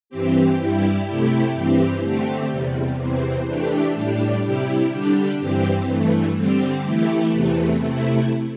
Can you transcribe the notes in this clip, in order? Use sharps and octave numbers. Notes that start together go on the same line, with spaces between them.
G2 E3 C4 G4
G2 G3 E4 G4
C3 A3 E4 G4
G2 E3 C4 G4
D3 A3 C4 G4
E2 C3 G3
E2 C3 E3 C4
E3 A3 D4 G4
A2 G3 D4 G4
C3 G3 E4 G4
D3 G3 D4 G4
G2 E3 C4 G4
G2 E3 A3
D3 G3 C4 G4
E3 A3 E4 G4
E2 C3 E3 A3
C3 A3 E4